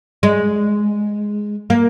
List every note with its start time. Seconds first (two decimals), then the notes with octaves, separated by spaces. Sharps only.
0.23 G#3
1.70 A#3